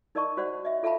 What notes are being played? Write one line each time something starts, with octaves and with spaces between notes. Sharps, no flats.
D#4 A#4 D5 D#5 A5 C#6
F#4 C5 D5 F#5
D#5 E5
F4 A4 E5 F5 A5 B5